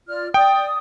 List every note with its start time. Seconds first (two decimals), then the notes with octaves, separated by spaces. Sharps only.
0.08 F4 D5 F6
0.34 D5 G5 D#6